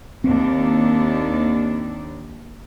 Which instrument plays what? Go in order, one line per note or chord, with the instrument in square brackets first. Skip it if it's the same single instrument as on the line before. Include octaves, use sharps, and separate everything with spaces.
[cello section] D#2 D4 [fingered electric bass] C4